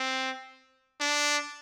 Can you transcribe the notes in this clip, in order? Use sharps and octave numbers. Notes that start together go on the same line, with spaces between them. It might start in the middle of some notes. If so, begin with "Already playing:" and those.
Already playing: C4
D4